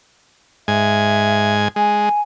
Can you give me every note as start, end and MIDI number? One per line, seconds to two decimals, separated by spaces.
0.68 1.68 44
0.68 1.55 76
0.68 1.68 80
1.76 2.09 56
1.76 2.21 80